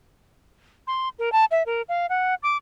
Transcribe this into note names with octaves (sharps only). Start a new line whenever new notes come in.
C6
A#4
A5
E5
A#4
F5
F#5
D6